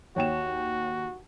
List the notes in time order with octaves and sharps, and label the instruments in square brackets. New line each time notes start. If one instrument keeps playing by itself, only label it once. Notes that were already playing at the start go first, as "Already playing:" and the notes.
[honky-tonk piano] D#2 [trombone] F#4 [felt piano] C#5 G5 E7